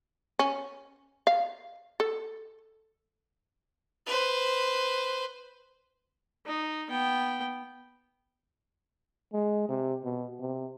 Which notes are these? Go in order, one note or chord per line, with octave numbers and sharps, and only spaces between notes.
C#4
F5
A4
B4 C5
D#4
B3 G5
G#3
C3
B2
C3